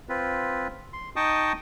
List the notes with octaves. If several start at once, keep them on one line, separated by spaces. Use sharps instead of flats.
C4 F4 B4
C6
D#4 D#5 G5 A5 C#6 D#6